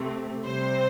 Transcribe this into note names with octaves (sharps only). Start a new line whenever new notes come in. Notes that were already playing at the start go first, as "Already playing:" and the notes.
Already playing: C3 A3 C4
C3 G3 C4 C5